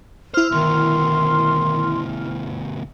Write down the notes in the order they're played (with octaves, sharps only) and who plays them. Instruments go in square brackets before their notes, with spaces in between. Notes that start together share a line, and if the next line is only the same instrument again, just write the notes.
[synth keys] E4 F6 [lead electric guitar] C5
[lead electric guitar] D2 B2 [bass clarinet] D#3 [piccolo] C6